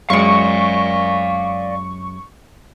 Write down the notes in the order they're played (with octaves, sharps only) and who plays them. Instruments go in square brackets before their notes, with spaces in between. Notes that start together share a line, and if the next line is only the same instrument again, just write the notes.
[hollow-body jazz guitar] F#2 G#3 [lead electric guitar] D5 F5 [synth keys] C#6